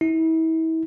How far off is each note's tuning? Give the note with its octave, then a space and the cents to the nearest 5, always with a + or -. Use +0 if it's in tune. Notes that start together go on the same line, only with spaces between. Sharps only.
E4 -35